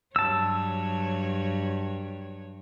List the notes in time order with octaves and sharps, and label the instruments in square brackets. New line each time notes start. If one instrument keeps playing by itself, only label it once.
[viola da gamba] G2 F#3 C#5 [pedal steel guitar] A5 E6